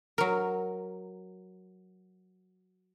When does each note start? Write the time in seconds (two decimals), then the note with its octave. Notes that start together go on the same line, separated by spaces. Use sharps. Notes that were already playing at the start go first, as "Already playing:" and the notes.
0.18 F#3 A#4